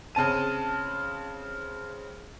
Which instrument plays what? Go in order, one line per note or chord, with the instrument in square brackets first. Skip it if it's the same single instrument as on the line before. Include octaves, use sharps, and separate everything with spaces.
[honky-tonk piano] C#3 C4 A5 D#7